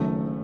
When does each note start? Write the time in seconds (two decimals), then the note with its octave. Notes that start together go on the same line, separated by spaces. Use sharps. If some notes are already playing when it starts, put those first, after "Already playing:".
Already playing: F#1 F#2 D#3 F#3 A3